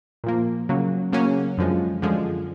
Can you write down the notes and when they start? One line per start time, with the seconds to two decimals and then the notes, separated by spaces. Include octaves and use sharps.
0.24 A#2 F3 A#3
0.69 C#3 F#3 A#3 C#4
1.13 C#3 F#3 A#3 C#4
1.58 F#2 D3 F3 G#3
2.02 F#2 D3 F3 G#3